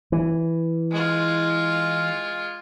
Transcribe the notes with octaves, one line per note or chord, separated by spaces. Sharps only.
E3
G#3 F4